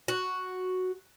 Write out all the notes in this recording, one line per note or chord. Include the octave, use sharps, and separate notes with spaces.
F#4